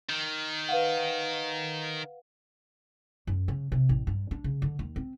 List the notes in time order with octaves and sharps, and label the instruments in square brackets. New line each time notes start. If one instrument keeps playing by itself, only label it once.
[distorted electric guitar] D#3
[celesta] B4 F5 F#5
[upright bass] F#2
C#3
C3
A1
G2
D4
C#3
D3
D#2
C4